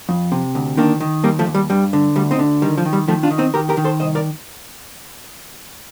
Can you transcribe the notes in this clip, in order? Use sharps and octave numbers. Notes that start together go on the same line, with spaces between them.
F2
C3
D2
D#3 A#3 D4
D#3
D#2 G3 A#3
F3 A3
D#2
G3
G2 G3
D3
D2 G3
C4 D#4
D3
D#3 G3
F3
D#3
G3
D#3 F3 A3
D4 F4
D#3
C4 D#4
D#3 G4 A#4
G4 A#4
D#3
A4 C5
C2 C5 D#5
A#4 D5